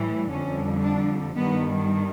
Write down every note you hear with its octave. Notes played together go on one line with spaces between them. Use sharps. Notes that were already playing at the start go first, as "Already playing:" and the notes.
Already playing: A2 E3 G3
F2 D3 G3 C#4
D4
G2 D#3 G3 B3